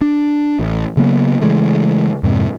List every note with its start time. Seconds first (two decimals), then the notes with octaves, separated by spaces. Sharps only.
0.01 D4
0.59 A1
0.97 C#3 F#3 A#3 B3
1.42 C#3 E3 G#3 A3
2.23 F2 G#2 C3